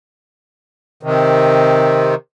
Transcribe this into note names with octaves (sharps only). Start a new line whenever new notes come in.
C3 D#3